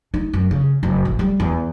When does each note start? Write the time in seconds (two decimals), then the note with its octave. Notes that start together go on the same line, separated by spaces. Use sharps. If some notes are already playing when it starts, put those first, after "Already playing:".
0.14 D#4
0.33 F#2
0.51 C#3
0.83 F#1
1.05 A1
1.19 G3
1.40 E2